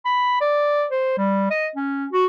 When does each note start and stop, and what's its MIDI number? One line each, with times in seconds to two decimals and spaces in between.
0.05 0.36 83
0.41 0.85 74
0.91 1.14 72
1.18 1.48 55
1.51 1.67 75
1.76 2.06 61
2.13 2.26 66